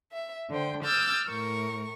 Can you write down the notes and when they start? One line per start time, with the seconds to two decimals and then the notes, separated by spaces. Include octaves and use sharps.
0.12 E5
0.50 D3 C5 G5
0.84 D6 E6 F6 G6 A6
1.30 A2 A#4 C#6